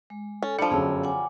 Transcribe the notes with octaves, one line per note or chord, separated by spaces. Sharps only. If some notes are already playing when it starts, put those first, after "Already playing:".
G#3
C#4 A4
F3 G3 D4 A5 C#7
G1 F#2 G#4 F5 E6
F#5 G#5 D6